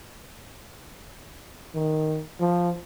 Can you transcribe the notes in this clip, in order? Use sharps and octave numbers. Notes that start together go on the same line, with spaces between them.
D#3
F3